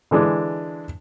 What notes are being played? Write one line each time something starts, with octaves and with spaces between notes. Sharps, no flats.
D3 E3 G#3 D4